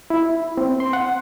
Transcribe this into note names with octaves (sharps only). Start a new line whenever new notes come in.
E4
C4
C6
F#5